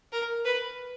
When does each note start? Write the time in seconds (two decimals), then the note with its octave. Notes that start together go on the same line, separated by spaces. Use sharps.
0.12 A#4
0.45 B4